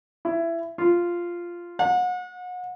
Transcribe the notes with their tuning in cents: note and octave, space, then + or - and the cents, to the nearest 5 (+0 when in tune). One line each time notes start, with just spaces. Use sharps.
E4 +20
F4 -5
F#5 -35